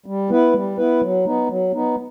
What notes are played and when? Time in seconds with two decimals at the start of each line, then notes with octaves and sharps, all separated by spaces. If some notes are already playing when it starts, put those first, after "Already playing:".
0.06 G3
0.30 B3 E4 B4
0.54 G3
0.77 B3 E4 B4
1.01 F#3
1.25 B3 D#4
1.48 F#3
1.72 B3 D#4